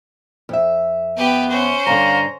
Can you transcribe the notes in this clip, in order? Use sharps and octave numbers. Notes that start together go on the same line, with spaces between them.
F2 E5
B3 G4 B4
C#4 C5
G2 D3 F5 A#5